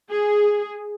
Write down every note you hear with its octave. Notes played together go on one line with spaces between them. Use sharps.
G#4